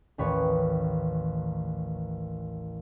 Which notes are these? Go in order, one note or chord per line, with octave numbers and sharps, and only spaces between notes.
A1 D#2 B4 C#5